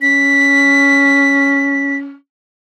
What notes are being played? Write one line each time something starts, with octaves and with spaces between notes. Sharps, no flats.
C#4 B6